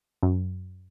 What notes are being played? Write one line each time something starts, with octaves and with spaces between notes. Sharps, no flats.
F#2